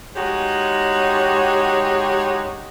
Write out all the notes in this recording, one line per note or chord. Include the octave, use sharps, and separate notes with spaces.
G#3 D#4 F#4 G4 C#5